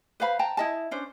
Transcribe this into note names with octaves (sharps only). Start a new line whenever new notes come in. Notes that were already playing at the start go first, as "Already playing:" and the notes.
B4 C5 F5 B5
G5 A5 A#5
E4 D#5 A5
C#4 D4 C5